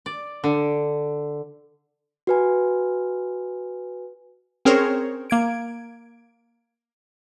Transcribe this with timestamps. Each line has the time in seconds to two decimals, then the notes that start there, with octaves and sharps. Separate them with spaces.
0.06 D5
0.44 D3
2.27 F#4 B4 G#5
4.65 C4 C#4 G#4 A#4 C5 C#5
5.30 A#3 G#6 D7